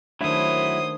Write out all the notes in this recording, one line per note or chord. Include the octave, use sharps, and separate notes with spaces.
D#3 F#3 A3 D4 E4 C5 D#6